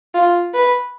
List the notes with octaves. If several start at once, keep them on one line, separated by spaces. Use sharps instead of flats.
F4
B4